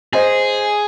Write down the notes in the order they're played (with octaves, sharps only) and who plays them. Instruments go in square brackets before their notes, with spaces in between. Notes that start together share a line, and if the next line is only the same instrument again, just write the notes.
[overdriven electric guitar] G#4 [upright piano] C5 D#5